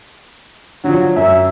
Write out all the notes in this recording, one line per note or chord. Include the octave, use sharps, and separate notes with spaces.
D3 F3 F#3
F#2 E5